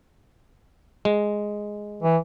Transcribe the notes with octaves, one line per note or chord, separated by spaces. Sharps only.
G#3
E3